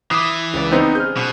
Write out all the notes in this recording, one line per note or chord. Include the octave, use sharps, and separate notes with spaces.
E3 D6 D#6 C7
C#2 C#5 D5
B3 C4 D#4 C5
G#4 F6 G6
B2